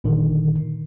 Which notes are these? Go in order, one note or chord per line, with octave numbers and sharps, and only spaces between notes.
G1 A#2 D3 D#3